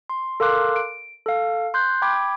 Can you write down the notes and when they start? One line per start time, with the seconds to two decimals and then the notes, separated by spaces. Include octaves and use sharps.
0.10 C6
0.40 A4 A#4 F5 C6 D6 F#6
0.76 D7
1.26 A4 F5
1.74 C6 F#6 G6
2.02 G5 B5 D6 G#6